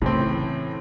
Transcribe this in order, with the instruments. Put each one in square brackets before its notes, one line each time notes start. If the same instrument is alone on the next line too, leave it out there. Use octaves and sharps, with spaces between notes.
[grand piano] A2 E3 C4 [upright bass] C#3